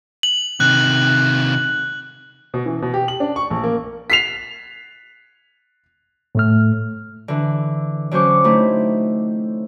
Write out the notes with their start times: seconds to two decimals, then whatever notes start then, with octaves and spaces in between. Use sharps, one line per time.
0.23 F#7
0.60 C3 D#3 F#6
2.54 B2
2.66 E3
2.82 B2
2.94 G4
3.08 F#7
3.20 D4
3.36 C#6
3.50 A#1
3.64 A#3
4.10 B6 C7 F7
6.35 A2 A3 F6
7.28 D3 E3
8.11 D3 F#3 C#4 C5 C#6 D6
8.44 A3 C4 D#4 E4